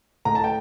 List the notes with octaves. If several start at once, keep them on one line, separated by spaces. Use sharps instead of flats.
A2 A#5
A5
G5